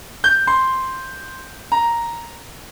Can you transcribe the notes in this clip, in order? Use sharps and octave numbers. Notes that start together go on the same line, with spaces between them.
G6
C6
A#5